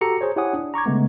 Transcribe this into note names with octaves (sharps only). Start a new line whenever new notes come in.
F#4 G4 A4 A#5 C#7
G#4 C5 C#5
E4 G4 C#5 F#5 G#5 D#6
D4
A#5 C#6 D6 G#6
C#3 G#3 A3 B3